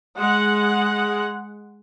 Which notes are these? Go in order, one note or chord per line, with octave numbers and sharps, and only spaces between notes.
G#3 F#5